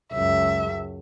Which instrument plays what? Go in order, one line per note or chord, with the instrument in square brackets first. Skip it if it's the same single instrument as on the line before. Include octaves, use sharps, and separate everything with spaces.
[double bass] C#2 F#2 [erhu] E5